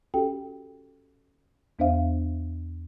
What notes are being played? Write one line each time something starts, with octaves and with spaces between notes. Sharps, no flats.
C#4 F#4 G4 A4 G5
E2 B3 D4 C5 E5 F5